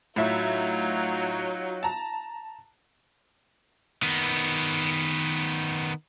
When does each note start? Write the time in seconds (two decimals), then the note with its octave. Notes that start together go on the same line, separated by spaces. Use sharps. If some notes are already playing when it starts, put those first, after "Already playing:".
0.16 A2 F#3 D#4 F4 E5
1.83 A5 A#5
4.02 D#3 B3